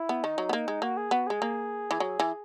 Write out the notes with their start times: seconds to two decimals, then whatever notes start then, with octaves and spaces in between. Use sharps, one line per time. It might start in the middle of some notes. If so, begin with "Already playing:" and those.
Already playing: E4
0.09 B3
0.24 D#3 D#4
0.38 F#3
0.49 B3
0.53 A#3
0.68 G#3
0.82 A#3 F#4
0.97 G#4
1.11 B3 F#4
1.27 G#3 G#4
1.42 A#3
1.91 E3
2.00 F#3
2.20 E3